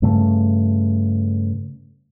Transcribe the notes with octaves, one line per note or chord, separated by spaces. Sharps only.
G2 C#3 A3